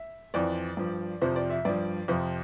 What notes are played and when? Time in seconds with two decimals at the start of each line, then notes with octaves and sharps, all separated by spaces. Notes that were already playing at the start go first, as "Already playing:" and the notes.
Already playing: E5
0.34 F2 E3 D5
0.77 G2 F3
1.21 F2 C3 F3 C5
1.36 D5
1.50 E5
1.65 G2 F3 D5
2.08 F2 C3 F3 C5